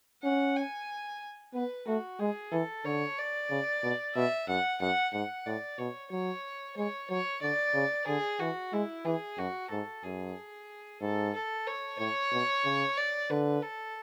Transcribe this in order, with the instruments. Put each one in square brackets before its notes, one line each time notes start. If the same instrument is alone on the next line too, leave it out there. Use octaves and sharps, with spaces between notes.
[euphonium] C#4 [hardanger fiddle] F#5
[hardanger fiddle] G#5
[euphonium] B3 [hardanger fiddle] B4
[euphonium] A3 [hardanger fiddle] F#4
[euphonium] G#3 [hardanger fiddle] G#4
[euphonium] E3 [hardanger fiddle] A4
[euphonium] D3 [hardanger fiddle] C#5
[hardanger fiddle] D5
[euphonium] C#3
B2
[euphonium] B2 [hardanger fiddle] E5
[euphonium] F#2 [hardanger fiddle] F#5
[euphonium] F#2 [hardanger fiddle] F#5
[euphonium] G#2 [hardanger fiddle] F#5
[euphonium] A2 [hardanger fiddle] D5
[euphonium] B2 [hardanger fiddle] C#5
[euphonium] F#3 [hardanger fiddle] C#5
[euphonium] G#3 [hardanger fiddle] C#5
[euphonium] F#3 [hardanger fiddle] C#5
[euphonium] D3 [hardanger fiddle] D5
[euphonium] C#3
[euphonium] D3 [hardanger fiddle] G#4
[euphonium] E3 [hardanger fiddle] F#4
[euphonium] G#3 [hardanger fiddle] E4
[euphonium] E3 [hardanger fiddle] G#4
[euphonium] F#2 [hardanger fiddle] F#4
[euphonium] G#2 [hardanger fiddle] A4
[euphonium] F#2 [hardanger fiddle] G#4
[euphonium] G#2 [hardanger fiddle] A4
[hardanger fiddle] A4
C#5
[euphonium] A2 [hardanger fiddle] C#5
[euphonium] B2
C#3
[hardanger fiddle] D5
[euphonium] D3 [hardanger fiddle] B4
[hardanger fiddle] A4